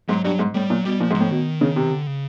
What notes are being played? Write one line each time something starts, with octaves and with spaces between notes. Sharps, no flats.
G#2 F#3
G2 F#3
G#2
A2 G3
A#2 F#3
B2 G3
A#2 F3
G#2
F3
A2
B2 D#3
C#3
C3
D3
C#3